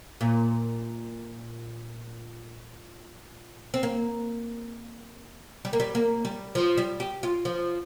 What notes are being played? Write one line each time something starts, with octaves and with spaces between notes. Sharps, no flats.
A#2
C4
A#3
G3
A#3
G3
A#3
G3
F3
G3
G4
F4
F3